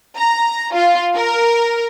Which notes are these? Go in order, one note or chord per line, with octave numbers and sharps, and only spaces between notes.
A#5
F4
A#4